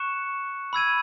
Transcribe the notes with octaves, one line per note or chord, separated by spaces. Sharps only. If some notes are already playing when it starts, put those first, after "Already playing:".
Already playing: C#6 F#6 C#7 E7
B5 E6 G#6 D#7